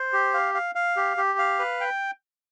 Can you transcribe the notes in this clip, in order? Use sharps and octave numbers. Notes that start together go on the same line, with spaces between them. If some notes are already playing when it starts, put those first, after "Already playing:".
Already playing: C5
G4
F5
F5
F5
G4
G4
F5
B4
G5